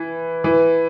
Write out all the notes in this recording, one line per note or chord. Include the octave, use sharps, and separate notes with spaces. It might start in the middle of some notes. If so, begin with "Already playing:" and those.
Already playing: E3
E3